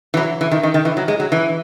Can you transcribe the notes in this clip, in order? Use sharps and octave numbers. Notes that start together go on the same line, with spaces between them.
E3
F#3
E3
D#3
D#3
D#3
E3
F#3
G#3
F#3
E3